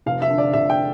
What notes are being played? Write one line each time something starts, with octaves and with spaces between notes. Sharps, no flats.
F1 F5
E5
D3
D5
F1 E5
G5